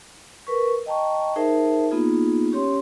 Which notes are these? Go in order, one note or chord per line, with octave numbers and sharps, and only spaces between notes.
A#4 B4 C#6
D#5 G5 A5 A#5 C#6
D#4 G#4 A#4 C5 E5 A5
A#3 B3 D#4 F4 G#4
C#4 G4 C#5 C6